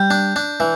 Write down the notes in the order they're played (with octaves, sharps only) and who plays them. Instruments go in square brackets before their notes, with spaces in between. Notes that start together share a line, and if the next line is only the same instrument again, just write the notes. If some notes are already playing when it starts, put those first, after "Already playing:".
Already playing: [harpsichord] G3 [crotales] G6
[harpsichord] D4
D4
E3